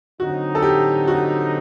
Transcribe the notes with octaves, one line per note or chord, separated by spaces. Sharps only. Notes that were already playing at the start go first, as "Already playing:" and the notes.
D3 F#3 C4 D#4 F#4
A4
G4
F#4